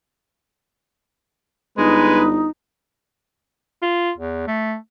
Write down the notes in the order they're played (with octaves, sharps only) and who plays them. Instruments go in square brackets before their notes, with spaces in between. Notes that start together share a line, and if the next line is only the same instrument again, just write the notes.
[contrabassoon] G1 [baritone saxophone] G#3 [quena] D#4 [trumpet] B4
[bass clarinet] F4
E2
A3